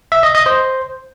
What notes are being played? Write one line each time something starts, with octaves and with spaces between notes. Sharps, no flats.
E5
D#5
D#5
C5